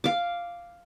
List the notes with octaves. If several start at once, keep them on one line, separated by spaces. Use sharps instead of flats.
F5 D6